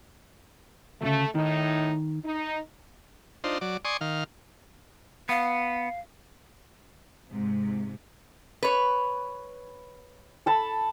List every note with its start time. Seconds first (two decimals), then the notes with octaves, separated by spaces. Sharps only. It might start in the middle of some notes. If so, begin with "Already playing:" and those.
1.01 D2 A2 C#3 A3
1.35 A2 D#3 D#4
2.24 D#4
3.44 D4 D#4 F4 C5
3.61 F#3 D5
3.85 D5 G#5 C6 C#6 D#6
4.01 D#3 F5
5.29 B3 F5
7.29 G#2 C3
8.63 B4 C#5
10.46 A4 A5 B5